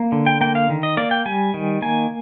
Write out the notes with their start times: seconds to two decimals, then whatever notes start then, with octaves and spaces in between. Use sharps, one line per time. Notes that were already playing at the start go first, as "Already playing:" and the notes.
Already playing: A#3
0.12 D3
0.26 G5
0.41 A#3 G5
0.55 F5
0.70 D#3
0.83 D#5
0.97 A#3 D5
1.11 G5
1.26 G3 G#5
1.54 D#3
1.82 A#3 G#5